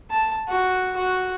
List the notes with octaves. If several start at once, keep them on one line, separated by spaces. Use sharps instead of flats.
A5
F#4
F#4